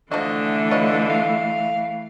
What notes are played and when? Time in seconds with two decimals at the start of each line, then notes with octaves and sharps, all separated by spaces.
0.12 D3 E3 F3 A3 F#4 D#5
0.71 F4 B4 C#5 D#5
1.10 F5